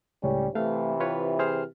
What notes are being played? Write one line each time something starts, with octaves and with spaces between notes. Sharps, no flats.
C#2 A2 G3 C#4
C3 E3 A3 F5
F4 B4 C#5
G#4 C5 F6